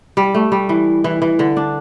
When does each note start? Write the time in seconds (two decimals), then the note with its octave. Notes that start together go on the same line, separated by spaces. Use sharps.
0.17 G3
0.34 A3
0.52 G3
0.69 E3
1.04 E3
1.22 E3
1.39 D3
1.57 D4